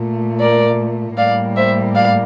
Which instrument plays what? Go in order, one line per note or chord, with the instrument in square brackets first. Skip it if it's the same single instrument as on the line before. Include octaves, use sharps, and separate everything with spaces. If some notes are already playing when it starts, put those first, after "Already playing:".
Already playing: [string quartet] A#2 A3
A#4 D5
A2 G3 A#3 D5 F5
C5 E5
D5 F5